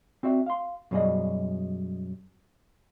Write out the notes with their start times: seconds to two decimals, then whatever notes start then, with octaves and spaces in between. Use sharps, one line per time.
0.23 C4 F#4 D5 E5
0.46 F5 C6
0.91 F#2 B2 G3 G#4 D5 D#5